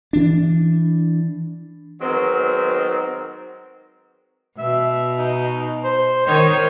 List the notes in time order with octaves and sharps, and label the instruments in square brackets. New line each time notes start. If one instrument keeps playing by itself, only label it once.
[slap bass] E3 D4
[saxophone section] D#3 F#3 G#3 B3 C4
[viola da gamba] B2 [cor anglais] E5
[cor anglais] D#4
C5
[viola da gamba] D#3 D#4 C#5 [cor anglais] C5